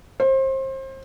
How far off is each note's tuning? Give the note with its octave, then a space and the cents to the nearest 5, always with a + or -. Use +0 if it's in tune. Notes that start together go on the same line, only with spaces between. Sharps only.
C5 +30